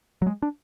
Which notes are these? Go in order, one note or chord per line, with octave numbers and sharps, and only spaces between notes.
F#3
G#3
D4